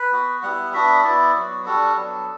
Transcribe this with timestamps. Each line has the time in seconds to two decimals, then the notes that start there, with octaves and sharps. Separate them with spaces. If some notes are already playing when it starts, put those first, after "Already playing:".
Already playing: B4
0.12 B3 F#4
0.43 G3 B3 E4 F#5
0.73 B3 D4 F#4 E5
1.04 B3 E4 D5
1.35 F#3 B3 F#4
1.65 G3 D4 F#4 A4
1.96 F#3 B3 D4